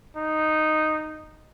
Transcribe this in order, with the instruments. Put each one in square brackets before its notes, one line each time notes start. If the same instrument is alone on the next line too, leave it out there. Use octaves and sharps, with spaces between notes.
[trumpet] D#4